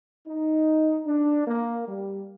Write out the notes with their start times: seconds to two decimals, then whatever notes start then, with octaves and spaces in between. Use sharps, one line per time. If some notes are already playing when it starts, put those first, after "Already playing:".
0.27 D#4
1.06 D4
1.47 A#3
1.87 G3